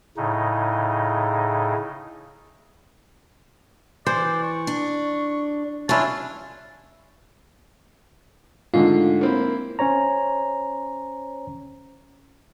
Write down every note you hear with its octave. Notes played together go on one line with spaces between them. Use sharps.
A2 C#3 D#4
E3 C5 D5
C#6
D4
C#4 D4 E4 F4 A5
G#2 D3 A3 F4
A#3 C4 E4
C#4 C5 C#5 A#5